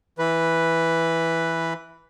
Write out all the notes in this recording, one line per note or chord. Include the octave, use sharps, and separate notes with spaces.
E3 B4